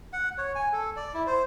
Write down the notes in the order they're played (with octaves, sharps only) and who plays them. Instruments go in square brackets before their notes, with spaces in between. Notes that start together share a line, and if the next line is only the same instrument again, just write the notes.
[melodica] F#5
C#5
G#5
A4
D5
E4
C5